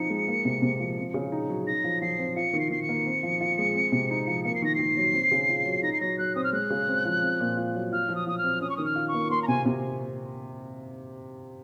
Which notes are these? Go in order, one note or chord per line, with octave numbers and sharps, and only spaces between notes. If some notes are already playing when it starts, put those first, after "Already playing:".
Already playing: F3 C4 D#4 C#7
G#3
A#3
C3
C3
F3
C4
C#3
D#4
F#3
D#4 A#6
F3
F3 C7
C4
F4 C#7
D#3
C7
D#3 C7
C#7
A#3
C4
F3
F4
G#3
C4
C3
D#4
F3
A#3 C#7
C7
D#3 A#6
D#3 C7
F#3
C4
C#3
F4
F#3
D#4 A#6
C7
F#3 A#6
F#3 F#6
C4 D#6
F6
G#3 F#6
C#3
C4
F3
C4
A#2
F4
F#3
F4 F6
F3
D#6
F3 D#6
F6
C4
C#4 D#6
C#6
D#3 D#6
F6
F4
C#6
A#3
A#3 C6
A#5
C3 G#5
C3